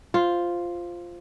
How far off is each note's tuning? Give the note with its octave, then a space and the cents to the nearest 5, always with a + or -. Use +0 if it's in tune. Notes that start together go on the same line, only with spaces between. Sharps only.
F4 +0 C5 +0